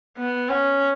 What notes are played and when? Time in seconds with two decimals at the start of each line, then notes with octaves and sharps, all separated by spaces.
0.18 B3
0.49 C#4